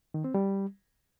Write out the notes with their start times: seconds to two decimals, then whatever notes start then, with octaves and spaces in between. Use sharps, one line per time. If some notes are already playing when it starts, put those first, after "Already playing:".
0.14 D#3
0.24 C4
0.34 G3